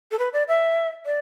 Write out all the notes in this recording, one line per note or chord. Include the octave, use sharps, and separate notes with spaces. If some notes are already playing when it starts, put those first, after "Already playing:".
A4
B4
D5
E5
D5